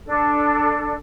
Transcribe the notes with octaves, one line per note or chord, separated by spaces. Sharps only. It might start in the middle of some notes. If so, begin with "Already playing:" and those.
D4 A4